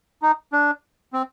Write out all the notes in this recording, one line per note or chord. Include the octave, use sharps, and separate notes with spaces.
D#4
D4
C4